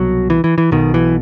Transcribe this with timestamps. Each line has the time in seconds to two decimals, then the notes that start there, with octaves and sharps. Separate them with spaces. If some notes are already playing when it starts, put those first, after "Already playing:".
Already playing: C2 B2 F#3
0.30 E3
0.44 E3
0.58 E3
0.71 B1 B2 D#3
0.94 E3